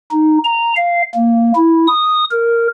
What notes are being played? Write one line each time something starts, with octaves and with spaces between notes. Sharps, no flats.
D#4
A#5
F5
A#3
E4
D#6
A#4